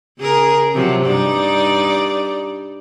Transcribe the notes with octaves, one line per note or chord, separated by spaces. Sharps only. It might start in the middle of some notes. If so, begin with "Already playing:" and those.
C#3 G#4 A#4
C3 F3 F#3
G2 D#4 D5